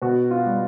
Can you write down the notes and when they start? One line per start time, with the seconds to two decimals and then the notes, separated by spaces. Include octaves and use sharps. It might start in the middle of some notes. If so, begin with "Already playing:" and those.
0.02 B2 F#4
0.31 F4
0.46 G3